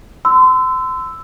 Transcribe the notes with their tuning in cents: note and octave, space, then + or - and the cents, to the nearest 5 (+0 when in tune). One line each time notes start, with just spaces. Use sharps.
C6 -35 E6 +0